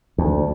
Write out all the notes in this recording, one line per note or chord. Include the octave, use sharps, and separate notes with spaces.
D2